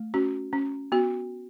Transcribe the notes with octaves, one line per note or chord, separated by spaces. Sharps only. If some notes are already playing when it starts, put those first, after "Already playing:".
Already playing: A3
C#4 F#4
C#4
B3 F#4